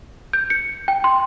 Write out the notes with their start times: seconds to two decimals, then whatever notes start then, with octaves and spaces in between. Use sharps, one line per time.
0.33 G6
0.50 C#7
0.88 G5
1.04 C6